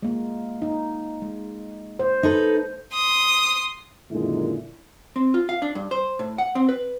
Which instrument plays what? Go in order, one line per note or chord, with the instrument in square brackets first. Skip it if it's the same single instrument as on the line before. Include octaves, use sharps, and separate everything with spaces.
[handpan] G#3 A#3
D#4
G#3
C5
[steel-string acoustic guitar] D#4 A4 B4
[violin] C6 D#6
[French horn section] F#2 A#2 D3 D#3 G#3 E4
[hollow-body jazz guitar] C4
F4
F5
D4
G2
C5
A2
F#5
C4
B4